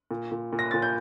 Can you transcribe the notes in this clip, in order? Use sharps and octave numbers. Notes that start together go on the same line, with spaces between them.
A#2
A#2
A#2
A#6
A#2 A6
G6